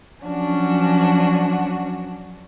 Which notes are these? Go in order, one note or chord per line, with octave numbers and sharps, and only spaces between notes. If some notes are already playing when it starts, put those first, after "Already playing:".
F3 F#3 C#4 D4 F#4